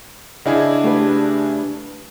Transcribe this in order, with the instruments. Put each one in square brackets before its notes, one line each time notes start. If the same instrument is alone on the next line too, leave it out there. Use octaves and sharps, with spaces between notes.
[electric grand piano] C#3 E4 G#4 [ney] D4 [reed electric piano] D5 D#5 F#5
[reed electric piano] A3 G4 B4